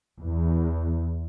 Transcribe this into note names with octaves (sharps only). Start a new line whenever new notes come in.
E2